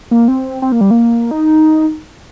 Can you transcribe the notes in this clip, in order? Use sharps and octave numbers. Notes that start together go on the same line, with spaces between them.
A#3
C4
C4
A#3
G3
A#3
D#4